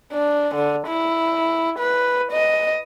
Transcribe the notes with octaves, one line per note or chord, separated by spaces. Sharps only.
D4
D3
E4
B4
D#5